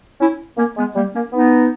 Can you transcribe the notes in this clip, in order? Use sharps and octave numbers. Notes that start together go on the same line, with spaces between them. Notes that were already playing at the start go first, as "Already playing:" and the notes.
C#4 E4
A#3 C#4
G#3 B3
G3 A#3
A#3 C#4
B3 D#4